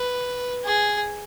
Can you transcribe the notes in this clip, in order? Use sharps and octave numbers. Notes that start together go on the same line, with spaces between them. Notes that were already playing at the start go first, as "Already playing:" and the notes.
Already playing: B4
G#4